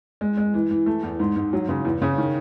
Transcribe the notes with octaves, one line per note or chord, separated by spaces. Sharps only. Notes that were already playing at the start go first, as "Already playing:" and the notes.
G#3
G#3
E3
E3
A3
E2
G#2
G#2
F#3
C#3
E2
C#3
D#3